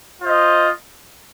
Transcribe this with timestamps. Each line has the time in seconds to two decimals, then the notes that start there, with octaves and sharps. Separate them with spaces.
0.21 F4 C5 D#5